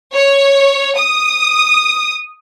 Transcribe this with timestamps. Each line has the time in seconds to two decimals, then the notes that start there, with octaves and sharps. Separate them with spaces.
0.14 C#5
0.97 D#6